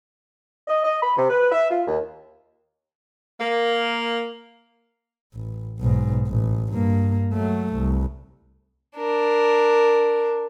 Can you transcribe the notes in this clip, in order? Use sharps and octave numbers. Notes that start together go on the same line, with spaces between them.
D#5
D#5
B5
C3
B4
E5
F4
D#2
A#3
A1
B1 G#2
A1
G2 A#3
F#3 A3
C2
D4 A#4